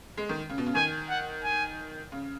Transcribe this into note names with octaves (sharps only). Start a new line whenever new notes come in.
G#3
D#3
C#3
B2
C#3
D#3 G#5
F#5
G#5
C#3